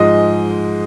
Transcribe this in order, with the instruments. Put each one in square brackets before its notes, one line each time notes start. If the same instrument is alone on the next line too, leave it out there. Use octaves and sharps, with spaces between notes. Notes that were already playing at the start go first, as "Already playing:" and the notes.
Already playing: [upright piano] G#2 F3 G#3 D#5